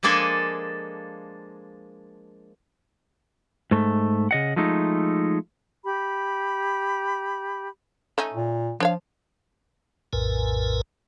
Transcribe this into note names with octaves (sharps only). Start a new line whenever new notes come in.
F3 G#3 A#3 D4 A4 G#5
G#2 A3
C#3 D#5 F#5
F3 G#3 A3 D#4
G4 B5
A3 C#4 D#4
A#2
F3 D4 C#5 F5
A#1 F2 A2 A#4 B4 G#5